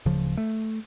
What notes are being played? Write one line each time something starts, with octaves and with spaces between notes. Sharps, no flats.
D1 C#3 F3
A3